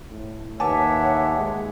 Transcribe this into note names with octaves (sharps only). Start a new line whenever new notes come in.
A2
D#2 B4 C#5 E5 F#5 G#5 A5 D6
G#3